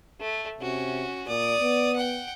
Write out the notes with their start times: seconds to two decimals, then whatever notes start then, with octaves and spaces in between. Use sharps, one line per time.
0.21 A3
0.61 C3 C#4 F#4
1.28 A#2 D5 D#6
1.60 B3
1.96 F#5 G5